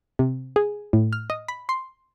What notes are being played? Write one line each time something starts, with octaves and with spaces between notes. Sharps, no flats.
C3
G#4
A2
F6
D#5
B5
C6